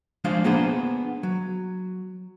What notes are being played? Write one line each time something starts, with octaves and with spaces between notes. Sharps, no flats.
F3 G#3 D4 F4 C5 F5
A#3 B3 D4 G#4 C5
F#3